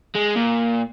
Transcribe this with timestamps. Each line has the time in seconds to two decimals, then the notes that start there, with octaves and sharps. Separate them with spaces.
0.15 G#3
0.36 A#2